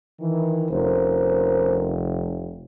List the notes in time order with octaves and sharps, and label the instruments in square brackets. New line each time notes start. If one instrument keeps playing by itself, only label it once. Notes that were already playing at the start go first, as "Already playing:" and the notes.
[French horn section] D#3 E3
[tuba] F1 [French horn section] C#4 A#4 C5